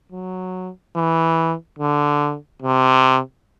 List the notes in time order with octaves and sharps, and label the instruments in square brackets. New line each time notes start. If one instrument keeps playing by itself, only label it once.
[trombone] F#3
E3
D3
C3